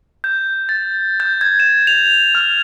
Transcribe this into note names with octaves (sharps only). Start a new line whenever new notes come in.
G6
A6
G6
G#6
E7
F7
F6